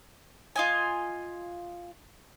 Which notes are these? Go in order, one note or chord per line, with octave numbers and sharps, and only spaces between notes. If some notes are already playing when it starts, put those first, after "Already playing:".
F4 D#5 G#5